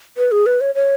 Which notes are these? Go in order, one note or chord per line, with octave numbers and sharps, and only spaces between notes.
B4
G#4
B4
C#5
C#5